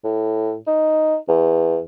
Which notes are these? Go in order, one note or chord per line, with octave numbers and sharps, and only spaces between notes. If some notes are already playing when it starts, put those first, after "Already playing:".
A2
D#4
E2